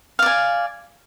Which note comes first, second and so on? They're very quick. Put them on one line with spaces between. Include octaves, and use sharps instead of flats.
F5 D5 G#5